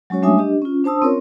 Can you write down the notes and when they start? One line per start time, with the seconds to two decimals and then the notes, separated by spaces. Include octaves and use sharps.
0.10 F#3 G#3 C#4 F#4 C#5
0.22 G3 A3 D4 E5 G#5 D#6
0.38 D4 G4 D#5
0.62 C#4 F4
0.84 D4 C5 A5 D#6 E6
1.02 C4 C#4 F4 A#4 C#5